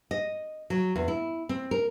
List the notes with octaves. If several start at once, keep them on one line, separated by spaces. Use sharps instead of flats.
D#5
F#3
E2
E4
C4
A#4